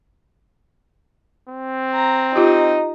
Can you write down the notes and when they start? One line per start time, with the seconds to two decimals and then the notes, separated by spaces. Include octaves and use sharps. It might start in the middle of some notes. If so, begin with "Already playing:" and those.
1.50 C4
1.94 A#5
2.36 D#4 F4 G4